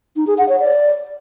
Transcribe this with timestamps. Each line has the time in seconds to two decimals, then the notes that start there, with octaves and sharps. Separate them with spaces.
0.16 D#4
0.27 G#4
0.38 F#5
0.49 C#5
0.60 D5